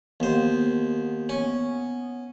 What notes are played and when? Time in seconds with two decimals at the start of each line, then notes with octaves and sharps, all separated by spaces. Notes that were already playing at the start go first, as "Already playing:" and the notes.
0.20 D#2 B3 C5
1.29 C#4